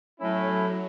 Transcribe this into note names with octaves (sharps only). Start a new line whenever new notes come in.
A2 F#3 A3 C#4 E4